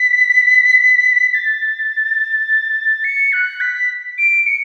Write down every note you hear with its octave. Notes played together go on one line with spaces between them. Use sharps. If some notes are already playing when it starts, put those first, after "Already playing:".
Already playing: B6
A6
C#7
F#6
B6
D7
C#7